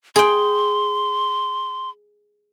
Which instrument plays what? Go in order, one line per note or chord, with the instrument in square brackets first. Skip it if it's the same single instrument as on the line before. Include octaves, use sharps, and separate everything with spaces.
[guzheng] G#4 G5 [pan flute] C6